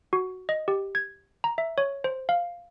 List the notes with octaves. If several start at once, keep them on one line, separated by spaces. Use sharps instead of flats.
F#4
D#5
G4
G#6
A#5
E5
C#5
C5
F5